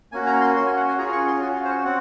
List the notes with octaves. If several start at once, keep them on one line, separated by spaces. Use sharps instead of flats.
A#3 C#4 F#4 G#5
A#5
C6
C#4 F#4 C6
G#5
F#5
G#5
C#4 F4 G#4 A#5
C#6
C6
C#4 F#4 G#5
F5
C5
C#5
C4 F#5